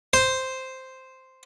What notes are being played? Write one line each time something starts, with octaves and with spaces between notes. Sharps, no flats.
C5